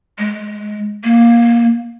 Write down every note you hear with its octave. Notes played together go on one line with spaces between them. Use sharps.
G#3
A#3